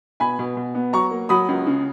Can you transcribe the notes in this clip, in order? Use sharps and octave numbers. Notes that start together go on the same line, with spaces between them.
B2 G#5 B5
B2
B2
B3
F#3 A#5 C#6
A#3
F#3 B5 D#6
C#2
C#3